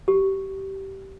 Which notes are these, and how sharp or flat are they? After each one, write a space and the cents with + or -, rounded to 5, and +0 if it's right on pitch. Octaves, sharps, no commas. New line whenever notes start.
G4 -20